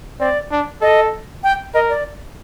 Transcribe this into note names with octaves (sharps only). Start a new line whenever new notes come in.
C4 D5
D4
A4 D#5
G5
A#4 D#5
D5